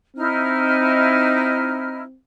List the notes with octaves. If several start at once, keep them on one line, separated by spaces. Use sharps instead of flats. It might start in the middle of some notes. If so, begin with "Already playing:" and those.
C4 D#4 E4 F6